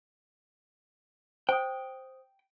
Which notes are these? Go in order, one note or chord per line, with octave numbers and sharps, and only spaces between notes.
C5 G5 D#6